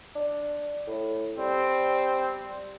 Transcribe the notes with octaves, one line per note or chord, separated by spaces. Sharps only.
D4
A2
G3 C4